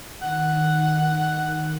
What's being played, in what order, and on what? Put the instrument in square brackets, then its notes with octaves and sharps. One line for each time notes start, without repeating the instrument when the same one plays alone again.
[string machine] D#3 [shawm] F#5